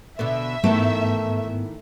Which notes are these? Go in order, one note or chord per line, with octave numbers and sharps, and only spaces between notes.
B2 D3 B3 E5
G#2 D#3 E3 A3 B3